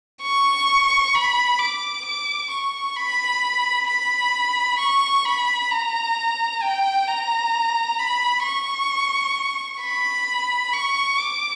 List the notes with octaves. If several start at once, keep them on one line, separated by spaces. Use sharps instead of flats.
C#6
B5
D6
D6
C#6
B5
B5
C#6
B5
A#5
G5
A#5
B5
C#6
B5
C#6
D6